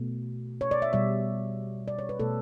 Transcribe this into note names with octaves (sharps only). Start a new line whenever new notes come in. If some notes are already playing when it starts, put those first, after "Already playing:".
Already playing: B2 A3
C#5
D5
E5
B2 G3 E5
D5
C#5
B4
B2 A3 A4